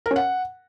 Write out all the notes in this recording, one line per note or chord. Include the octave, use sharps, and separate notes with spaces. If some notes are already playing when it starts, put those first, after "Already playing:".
A#4
C#4
F#5